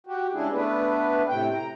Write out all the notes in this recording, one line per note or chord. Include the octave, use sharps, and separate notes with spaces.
F#4 G4
C#3 G3 G#3 D4 E4 G#4
A3 B3 D4 B4
A2 C3 G5
A#5